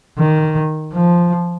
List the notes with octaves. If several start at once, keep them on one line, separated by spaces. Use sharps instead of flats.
D#3
F3